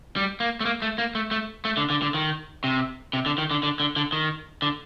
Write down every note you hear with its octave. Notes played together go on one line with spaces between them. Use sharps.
G3
A#3
A3
A#3
A3
A#3
A3
A3
A3
D3
D3
D3
D#3
C3
C3
D3
D#3
D3
D3
D3
D3
D#3
D3